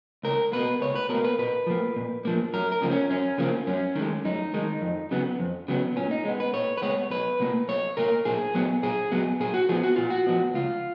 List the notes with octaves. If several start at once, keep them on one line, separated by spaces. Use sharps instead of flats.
C#2 A#4
B2 A#3 B4
C#2 C#5
B4
B2 A#4
A#3
B4
A#2 B4
F3 A#3
A#2
F3 A#3
F#2 A#4
A#4
C#3 F3 A#3
C#4
F#2 C#4
C#3 F3 A#3
F#2 C#4
D#3 G#3
F#2 D#4
D#3 G#3
F2
C#3 F#3 B3
F2
C#3 F#3 B3
A#2 C#4
D#4
G#3 B3
B4
A#2 C#5
B4
G#3 B3 C#5
B1 B4
B2 A#3
B1 C#5
B2 A#3 A#4
A#2 G#4
F#3 B3
A#2 G#4
F#3 B3
A#2 G#4
F#4
F3 B3 G#4
F#4
A#2 F4
F#4
F3 B3
C#2 F4